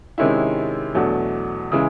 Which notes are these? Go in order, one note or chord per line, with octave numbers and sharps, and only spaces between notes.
C3 D#3 G#3 C#4 E4
E2 B2 F#3 A3 D4
C#3 E3 G#3